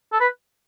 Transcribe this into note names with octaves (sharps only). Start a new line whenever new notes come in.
A4
B4